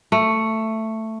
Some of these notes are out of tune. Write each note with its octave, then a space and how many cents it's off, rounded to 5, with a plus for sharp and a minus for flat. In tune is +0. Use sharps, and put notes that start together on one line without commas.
A3 +10